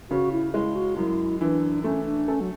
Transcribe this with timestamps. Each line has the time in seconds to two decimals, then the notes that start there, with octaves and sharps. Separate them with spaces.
0.10 C#3 F#4
0.32 E4
0.53 G#3 E4
0.75 F#4
0.97 F#2 E4
1.41 E3 D4
1.84 A3 C#4
2.06 D4
2.28 C#4 A4
2.41 F#3